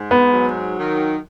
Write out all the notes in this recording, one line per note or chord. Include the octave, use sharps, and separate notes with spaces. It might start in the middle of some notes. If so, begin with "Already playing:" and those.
Already playing: G#2
B3
F#3
D#3